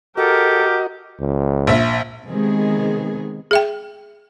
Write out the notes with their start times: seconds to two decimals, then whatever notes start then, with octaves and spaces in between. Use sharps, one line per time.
0.17 F#4 G4 A4 A#4 D#5
1.20 C#2
1.67 A#1 E5
2.27 C3 D#3 G#3 B3 G#4
3.51 G#4 E5 G5